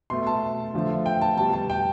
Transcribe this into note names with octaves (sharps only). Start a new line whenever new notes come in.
B2 A3 C6
A5
D3 F3 A3
G5
A5
B2 G3 A5
A5
G5